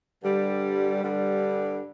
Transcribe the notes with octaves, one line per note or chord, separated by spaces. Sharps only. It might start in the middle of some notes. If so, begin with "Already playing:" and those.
G2 D3 G3
G2 D3 G3